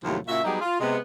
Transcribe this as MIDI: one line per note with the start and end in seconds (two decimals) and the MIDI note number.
0.04 0.19 39
0.04 0.19 45
0.04 0.19 48
0.04 0.19 53
0.04 0.19 54
0.04 0.19 57
0.28 0.44 46
0.28 0.44 49
0.28 0.44 66
0.28 0.44 76
0.44 0.59 54
0.44 0.59 55
0.44 0.59 59
0.44 0.59 63
0.44 0.59 67
0.44 0.59 68
0.61 0.79 65
0.80 0.97 48
0.80 0.97 56
0.80 0.97 59